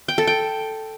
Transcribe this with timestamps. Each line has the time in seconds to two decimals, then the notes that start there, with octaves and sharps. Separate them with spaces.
0.08 G5
0.18 A4
0.27 G5